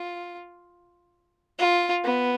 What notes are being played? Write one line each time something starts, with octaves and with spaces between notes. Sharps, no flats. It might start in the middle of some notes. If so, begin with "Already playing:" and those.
Already playing: F4
F4
B3